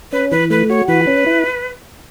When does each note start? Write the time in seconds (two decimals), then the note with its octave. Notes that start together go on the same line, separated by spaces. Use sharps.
0.12 C#4 B4
0.31 E3 B4
0.50 A3 B4
0.69 F#4 C#5
0.88 E3 B4
1.07 C#4
1.26 E4